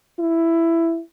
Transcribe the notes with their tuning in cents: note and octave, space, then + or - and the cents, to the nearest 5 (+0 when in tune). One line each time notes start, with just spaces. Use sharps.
E4 +10